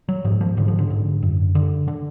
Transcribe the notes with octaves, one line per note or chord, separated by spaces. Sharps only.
F#3
G#2 F3
F3
G#2 D3
F3
D3
G#2
F#2
D3
D3